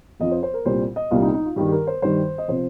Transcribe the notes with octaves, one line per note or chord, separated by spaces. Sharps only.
F2 F3 D#5
C5
C5
A#4
C2 A#2 G3 C5
D#5
C2 A#2 G3 F4
D#4
D#4
F4
G2 D#3 G3 G4
G4
A#4
C5
G2 D#3 G3 C5
D#5
C3 F3 C5